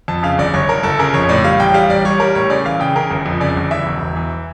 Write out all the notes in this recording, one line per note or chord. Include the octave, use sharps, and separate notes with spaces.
F2 A5
C#3 F5
G1 D5
G1 C#5
G1 A#4
G1 A4
C#3 A#4
F2 C#5
A2 D5
G3 F5
A1 G5
G3 F5
A1 D5
G3 C#5
G3 A#4
A2 C#5
C#3 D5
E3 F5
C#3 G5
C#3 A#4
G1
F2
C#3 D5
G1
E3 E5
E1
E1
E3